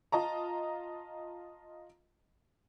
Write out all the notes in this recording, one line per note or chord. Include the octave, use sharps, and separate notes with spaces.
F4 D#5 A5 A#5